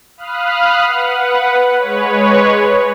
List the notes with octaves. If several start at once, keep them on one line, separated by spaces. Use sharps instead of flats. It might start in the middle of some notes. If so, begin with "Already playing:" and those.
F5 B5 D#6 F6 F#6
B4 F#5
G#3 B4 C#5